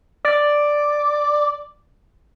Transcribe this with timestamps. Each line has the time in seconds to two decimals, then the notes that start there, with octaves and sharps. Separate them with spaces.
0.25 D5